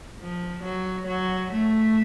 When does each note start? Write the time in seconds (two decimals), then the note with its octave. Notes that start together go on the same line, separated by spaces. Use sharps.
0.19 F3
0.63 F#3
1.07 F#3
1.52 A3